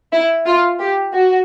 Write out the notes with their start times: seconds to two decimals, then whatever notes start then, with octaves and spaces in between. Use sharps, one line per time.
0.13 E4
0.46 F4
0.80 G4
1.14 F#4